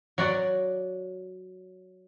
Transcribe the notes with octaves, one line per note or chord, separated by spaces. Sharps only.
F#3 F#4 D5